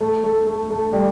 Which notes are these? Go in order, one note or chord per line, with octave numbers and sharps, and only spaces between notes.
A3
A3
A3
A3
G3